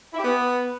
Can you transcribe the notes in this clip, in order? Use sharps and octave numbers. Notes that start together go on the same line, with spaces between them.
E4
G4
B3